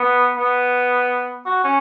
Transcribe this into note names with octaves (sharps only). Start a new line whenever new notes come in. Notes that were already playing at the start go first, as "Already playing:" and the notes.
Already playing: B3
B3
F#4
C#4